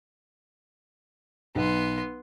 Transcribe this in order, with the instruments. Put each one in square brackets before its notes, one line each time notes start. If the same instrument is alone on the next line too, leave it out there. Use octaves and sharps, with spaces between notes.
[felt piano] B1 [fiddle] B3 C6